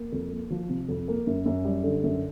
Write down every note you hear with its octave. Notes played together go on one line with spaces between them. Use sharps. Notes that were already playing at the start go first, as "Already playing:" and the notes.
Already playing: A#3
F2
A#3
F3
C3
F2
A#3
F#2
F#2
G3
D3
F#2